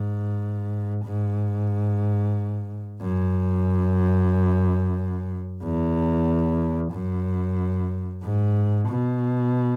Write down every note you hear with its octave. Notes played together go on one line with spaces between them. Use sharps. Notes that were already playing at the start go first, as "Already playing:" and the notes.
Already playing: G#2
G#2
F#2
E2
F#2
G#2
B2